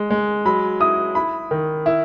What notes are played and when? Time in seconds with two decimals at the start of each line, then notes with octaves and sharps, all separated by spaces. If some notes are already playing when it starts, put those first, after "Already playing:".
Already playing: G#3
0.10 G#3
0.45 F#3 B5
0.80 E4 D#6
1.15 E4 B5
1.51 D#3
1.86 E4